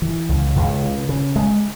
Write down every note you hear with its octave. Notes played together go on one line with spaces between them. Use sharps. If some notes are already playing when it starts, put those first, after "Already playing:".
E3
C#2
C#2
C#3
C#3
G#3